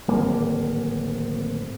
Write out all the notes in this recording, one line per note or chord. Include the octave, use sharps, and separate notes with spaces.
D1 G#1 A#3